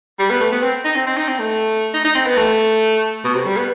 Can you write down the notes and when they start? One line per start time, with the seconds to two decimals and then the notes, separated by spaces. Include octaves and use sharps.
0.19 G3
0.30 B3
0.41 A3
0.52 B3
0.63 C4
0.85 D#4
0.96 C4
1.07 C4
1.17 D#4
1.29 C4
1.40 A3
1.94 D#4
2.05 D#4
2.15 C4
2.26 B3
2.37 A3
3.24 B2
3.35 C3
3.46 G3
3.57 B3